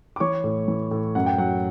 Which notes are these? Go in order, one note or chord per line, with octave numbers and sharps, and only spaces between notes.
D6
E3 C#5 C#6
A2
E3
A2
F#2 F#5
G5
F#3 F#5